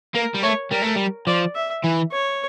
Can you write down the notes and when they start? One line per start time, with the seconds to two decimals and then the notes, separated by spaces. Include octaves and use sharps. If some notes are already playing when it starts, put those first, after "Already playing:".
0.15 A#3 A#4
0.35 G3
0.43 A3 C#5
0.72 G3 A#4
0.83 A3
0.96 G3
1.27 F3 D5
1.55 E5
1.84 E3
2.12 C#5